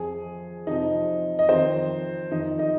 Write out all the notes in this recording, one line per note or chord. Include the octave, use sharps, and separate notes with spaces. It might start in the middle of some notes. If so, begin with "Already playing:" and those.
Already playing: F2 F3 G#4 G#5
F2 C3 F3 D#4 D#5
D#5
F2 D#3 C4 C5
F2 D#3 D#4 D#5
D#4 D#5